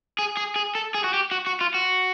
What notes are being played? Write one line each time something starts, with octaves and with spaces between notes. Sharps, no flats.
G#4
G#4
G#4
A4
G#4
F#4
G4
F#4
F#4
F4
F#4